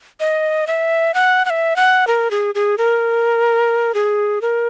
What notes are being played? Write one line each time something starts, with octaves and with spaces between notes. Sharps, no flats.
D#5
E5
F#5
F#5
E5
F#5
A#4
G#4
G#4
A#4
G#4
A#4